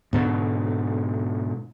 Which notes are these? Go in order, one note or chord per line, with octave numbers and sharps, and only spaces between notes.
G#2 B2 D3